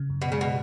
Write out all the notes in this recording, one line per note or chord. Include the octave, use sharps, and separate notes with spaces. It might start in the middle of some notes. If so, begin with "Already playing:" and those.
Already playing: C#3
F#2
B2
C#3 G#3
B2